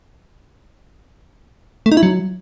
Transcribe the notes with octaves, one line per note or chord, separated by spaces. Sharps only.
A3
D#4
E4
F#3